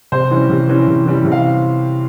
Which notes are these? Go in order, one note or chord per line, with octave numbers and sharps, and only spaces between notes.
C3 C5
E3 G3 C#4
C3
E3 G3 C#4
C3
E3 G3 C#4
C3
F5